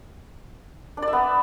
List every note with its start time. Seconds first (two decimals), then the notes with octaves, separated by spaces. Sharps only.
0.97 D4
1.02 D5
1.08 E5
1.13 B3